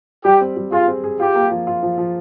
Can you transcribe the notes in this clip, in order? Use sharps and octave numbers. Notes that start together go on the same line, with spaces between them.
G3 G4
C4
G3
F4 G#4
C4
G#4
F4 G4
A#3
F3
F4
F3
F3